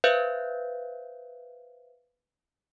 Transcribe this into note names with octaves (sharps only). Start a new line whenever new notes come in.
B4 C5 E5 F5 F#6 G6